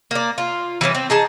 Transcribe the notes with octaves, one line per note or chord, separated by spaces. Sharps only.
A#3 D5
F4
E3 G3 C4 C#4
C4
D#4 G#4 A5